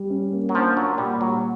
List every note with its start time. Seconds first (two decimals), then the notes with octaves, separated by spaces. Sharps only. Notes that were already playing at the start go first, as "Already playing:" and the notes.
Already playing: G3
0.10 C#4
0.33 A#3
0.49 F#3
0.55 F3 D4
0.76 F#3 A#3
0.98 A#2 G3
1.20 F#3 G3